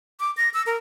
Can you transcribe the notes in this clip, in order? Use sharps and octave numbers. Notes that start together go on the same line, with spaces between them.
D6
A#6
E6
A#4